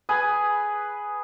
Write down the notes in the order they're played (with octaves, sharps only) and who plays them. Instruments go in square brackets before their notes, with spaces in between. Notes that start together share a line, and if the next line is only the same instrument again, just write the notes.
[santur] G#4 B4 G#5